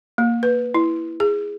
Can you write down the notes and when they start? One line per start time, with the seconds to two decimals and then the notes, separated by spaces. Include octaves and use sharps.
0.18 A#3
0.43 B4
0.74 E4
1.20 G#4